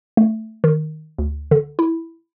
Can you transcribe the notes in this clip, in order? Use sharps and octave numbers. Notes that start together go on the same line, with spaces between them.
A3
D#3
D2
D3
E4